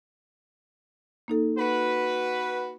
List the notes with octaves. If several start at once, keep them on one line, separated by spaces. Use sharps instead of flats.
A#3 D#4 A4
F#4 B4